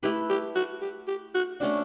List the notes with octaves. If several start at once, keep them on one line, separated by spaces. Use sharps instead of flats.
A3 E4 G4 B4
G4
F#4
G4
G4
F#4
A3 C#4 D4 F#4